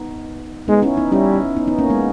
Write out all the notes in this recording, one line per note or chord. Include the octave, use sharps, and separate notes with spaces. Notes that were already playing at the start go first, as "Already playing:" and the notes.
Already playing: B3 D#4
G#3 B3 D#4
C#4 E4
B3 D#4
G3 C#4 E4
B3 D#4
B3 D#4
A#3 C#4
G#3 B3